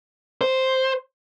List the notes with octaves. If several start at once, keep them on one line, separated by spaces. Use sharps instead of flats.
C5